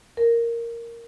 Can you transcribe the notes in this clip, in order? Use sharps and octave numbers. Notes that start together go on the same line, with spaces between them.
A#4